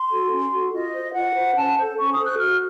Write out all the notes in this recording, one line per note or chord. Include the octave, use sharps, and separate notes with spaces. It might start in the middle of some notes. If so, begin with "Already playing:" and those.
Already playing: C6
F#4 A4
C#4
F#4 A4
F4 D#5
C5
F4 F#5
C5
C#4 A5
A4 C5
C#4 C#6
D#6
A4 C5
F#6
F#4 F6